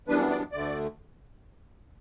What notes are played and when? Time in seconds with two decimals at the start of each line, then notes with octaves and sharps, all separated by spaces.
0.08 F#2 E3 G3 B3 D4 B4
0.31 D5
0.52 D2 D3 A3 D5